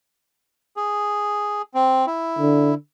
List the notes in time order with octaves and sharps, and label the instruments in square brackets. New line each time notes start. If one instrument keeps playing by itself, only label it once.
[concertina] G#4
C4
E4
[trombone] D3